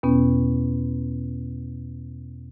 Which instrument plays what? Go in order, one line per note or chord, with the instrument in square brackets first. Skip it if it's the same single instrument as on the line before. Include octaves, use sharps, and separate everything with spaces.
[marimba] E2 B2 B3 C#4